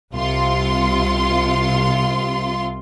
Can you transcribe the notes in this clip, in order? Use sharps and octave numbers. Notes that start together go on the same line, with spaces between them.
C2 C3 F4 C6